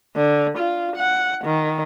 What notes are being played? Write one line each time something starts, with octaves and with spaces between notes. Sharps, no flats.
D3
F4
F#5
D#3